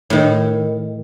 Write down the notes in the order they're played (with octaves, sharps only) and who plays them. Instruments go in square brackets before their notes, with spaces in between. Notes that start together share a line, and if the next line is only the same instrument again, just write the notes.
[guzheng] A2 D#3